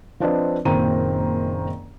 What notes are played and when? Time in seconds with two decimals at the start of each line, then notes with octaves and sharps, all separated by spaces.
0.20 F3 C4 D4 B4 D5 D#5
0.65 F#1 A#2 D#3 C4 A#5 D#7